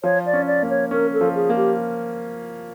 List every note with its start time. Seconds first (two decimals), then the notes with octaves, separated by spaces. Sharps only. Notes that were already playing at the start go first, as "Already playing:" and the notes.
0.04 F3 C#5
0.26 D5
0.33 C#4
0.47 D5
0.62 A#3
0.70 C#5
0.91 C#4 A#4
1.13 A4
1.21 F3
1.35 G#4
1.49 A#3
1.57 G4